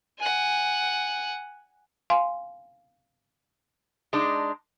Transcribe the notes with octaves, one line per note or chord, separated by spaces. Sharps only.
F#5 G#5
F5 G#5 C6
G#3 D4 D#4